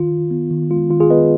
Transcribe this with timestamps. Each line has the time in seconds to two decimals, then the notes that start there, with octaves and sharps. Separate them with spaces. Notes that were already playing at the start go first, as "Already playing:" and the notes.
Already playing: D#3 F4
0.12 D#3
0.31 B3
0.51 D#3
0.70 G#3 F4
0.90 D#3 F4
1.00 F4 G#4
1.10 B3 B4 D#5